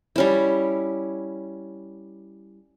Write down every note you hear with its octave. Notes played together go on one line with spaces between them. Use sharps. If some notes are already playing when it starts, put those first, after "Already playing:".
G3 C#4 E4